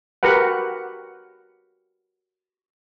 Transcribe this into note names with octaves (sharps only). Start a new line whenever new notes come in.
F#4 G4 A#4 B4 F#5